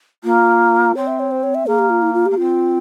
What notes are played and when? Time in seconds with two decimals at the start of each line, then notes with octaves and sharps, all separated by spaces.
0.24 A#3 F4
0.95 C4 C#5
1.07 E5
1.20 C#5
1.31 C5
1.43 C#5
1.55 E5
1.67 A#3 G#4
1.79 G4
1.90 F4
2.02 E4
2.14 F4
2.26 A#3 G4
2.37 C4 F4